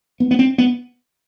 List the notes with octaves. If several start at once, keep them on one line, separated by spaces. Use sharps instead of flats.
B3
B3
C4
B3